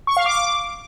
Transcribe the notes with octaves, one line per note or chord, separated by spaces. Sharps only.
C#6
F5
D6